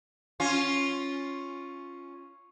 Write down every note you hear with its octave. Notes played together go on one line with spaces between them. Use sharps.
C#4 F4